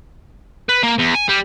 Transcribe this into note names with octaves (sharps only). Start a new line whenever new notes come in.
B4
A#3
E2
G#5
G3